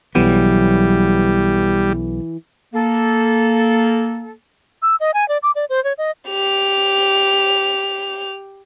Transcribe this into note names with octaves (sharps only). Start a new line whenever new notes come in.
B1 E3 F#3 G3 B3
A#3 A4
E6
D#5
G#5
D5
D6
D5
C5
C#5
D#5
G4 F7